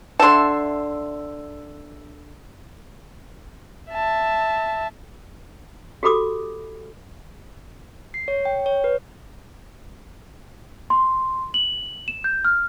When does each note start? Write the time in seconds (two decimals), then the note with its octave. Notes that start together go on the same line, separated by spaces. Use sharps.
0.19 D3 E5 A5 C6
3.91 E5 A5
6.03 F#4 G4 A4 B5 D6 D#6
8.14 C7
8.28 C#5
8.45 G5
8.66 C#5
8.84 B4
10.90 C6
11.54 F#7
12.08 E7
12.24 G6
12.45 F6